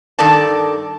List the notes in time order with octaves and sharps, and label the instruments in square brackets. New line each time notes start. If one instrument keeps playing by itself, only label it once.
[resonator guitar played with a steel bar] G2 D#3 A4 A#4 D5 A5